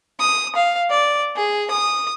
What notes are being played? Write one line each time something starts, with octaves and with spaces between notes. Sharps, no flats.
D#6
F5
D5
G#4
D#6